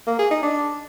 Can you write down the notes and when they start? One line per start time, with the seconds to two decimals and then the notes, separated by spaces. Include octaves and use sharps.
0.07 A#3
0.19 G#4
0.31 D#4
0.43 D4